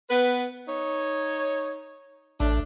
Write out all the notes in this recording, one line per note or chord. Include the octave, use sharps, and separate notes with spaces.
B3 B4
D#4 C#5
A1 A3 D4